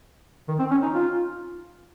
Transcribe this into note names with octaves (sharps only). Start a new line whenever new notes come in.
D#3
C4
C#4
D#4
F4